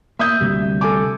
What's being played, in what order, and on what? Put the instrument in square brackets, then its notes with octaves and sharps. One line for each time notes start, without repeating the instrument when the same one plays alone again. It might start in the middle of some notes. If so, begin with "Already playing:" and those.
[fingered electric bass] A#3 [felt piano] E5 D#6 G6
[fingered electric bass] D2 C3 G3
[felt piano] A4 G#5 D6